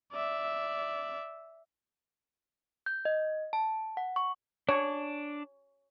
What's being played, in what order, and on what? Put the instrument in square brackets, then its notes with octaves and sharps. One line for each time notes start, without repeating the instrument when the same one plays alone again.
[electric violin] D5 E5
[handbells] G6
D#5
A5
F#5
C#6
[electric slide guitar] D4 [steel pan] C#5